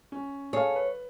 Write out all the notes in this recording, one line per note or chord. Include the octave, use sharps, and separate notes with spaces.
C#4
G#4 A4 C#5 F5
B4